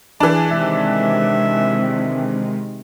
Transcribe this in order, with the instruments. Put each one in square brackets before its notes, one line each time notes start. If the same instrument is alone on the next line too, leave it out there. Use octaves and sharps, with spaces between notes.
[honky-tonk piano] E3 D4 [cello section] G#4
[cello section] C3 D#3 G#3 [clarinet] E5